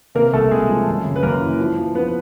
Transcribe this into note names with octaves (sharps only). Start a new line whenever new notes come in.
C3 A#3 A#4
C2 A3 A4
C2 G#3 G#4
F3
F#2
C#3
B4
F#2 A#3 A#4
E3
F3
F3
F3 B3 B4